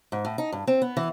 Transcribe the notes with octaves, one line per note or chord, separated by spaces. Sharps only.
G#2
A2
D#4
G2
C4
B3
E3